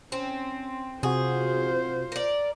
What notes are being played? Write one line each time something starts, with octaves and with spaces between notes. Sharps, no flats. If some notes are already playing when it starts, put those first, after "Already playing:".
C4 C#4
C3 F4 F#4 G#4 C5
A#4 D5